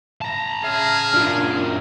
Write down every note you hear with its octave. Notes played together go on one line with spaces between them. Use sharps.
A5 A#5
C#3 G#4 E5 F6
F#2 A#2 D4 F4